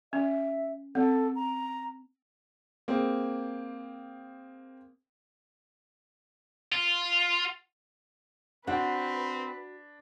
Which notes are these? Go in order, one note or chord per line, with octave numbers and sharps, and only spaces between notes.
C#4 E5
C4 A4
A#5
A#3 C4 G#4
F4
C4 D4 F#4 B4 F#5